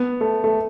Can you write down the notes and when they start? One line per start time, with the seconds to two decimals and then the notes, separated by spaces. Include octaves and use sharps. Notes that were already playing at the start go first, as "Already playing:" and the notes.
Already playing: B3
0.21 A3
0.44 A3